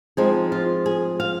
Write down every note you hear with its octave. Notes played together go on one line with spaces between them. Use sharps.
F3 G#3 C4 D#4 G#4
F4
G#4
F5